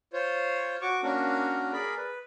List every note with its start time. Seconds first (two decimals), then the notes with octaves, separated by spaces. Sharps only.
0.13 F4 C5 C#5
0.82 F#4 C#6 D6
1.03 A#3 C#4 D4 F#4 A#4
1.73 G#4 A#4 D5 B5
1.97 B4